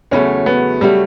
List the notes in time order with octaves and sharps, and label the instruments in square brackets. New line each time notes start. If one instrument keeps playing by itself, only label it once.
[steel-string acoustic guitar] E2 C#3 F#3 A3 [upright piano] C#4
[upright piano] B3
[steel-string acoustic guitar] C#3 F#3 A3 [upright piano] G3